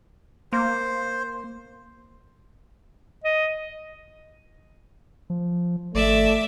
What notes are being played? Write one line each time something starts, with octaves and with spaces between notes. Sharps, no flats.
A#3 C5
D#5
F3
G#1 A3 D5 E5